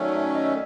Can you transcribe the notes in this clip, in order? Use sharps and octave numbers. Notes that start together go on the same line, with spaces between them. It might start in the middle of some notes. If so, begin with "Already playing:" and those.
Already playing: D#3 F#3 A3 C#4 D5
E5
D#5
E5